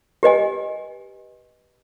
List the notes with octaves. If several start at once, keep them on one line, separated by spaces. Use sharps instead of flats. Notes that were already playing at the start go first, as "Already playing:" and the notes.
G4 B4 D#5 G#5